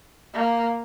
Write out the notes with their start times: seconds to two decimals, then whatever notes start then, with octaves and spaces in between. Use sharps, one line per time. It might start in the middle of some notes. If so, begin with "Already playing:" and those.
0.34 A#3